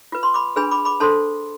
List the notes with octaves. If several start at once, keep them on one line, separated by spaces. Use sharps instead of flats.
F4 B4
C6
B5 D6
D4 G#4 B4 G#5 B5
B5 D6
B5 D6
D4 A4 C5 A5 C6